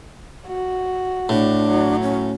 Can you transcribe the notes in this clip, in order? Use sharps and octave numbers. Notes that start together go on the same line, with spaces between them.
F#4
A2 D4
F#3
C#4